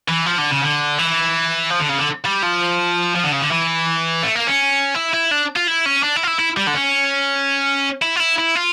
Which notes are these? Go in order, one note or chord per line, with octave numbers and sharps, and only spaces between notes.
E3
F3
D3
C#3
D3
E3
F3
D3
C#3
D3
G3
F3
F3
D3
C#3
D3
E3
A3
A#3
C#4
E4
E4
D4
F4
E4
C#4
D4
E4
F4
E4
E4
G3
D3
C#4
E4
F4
E4
E4
F4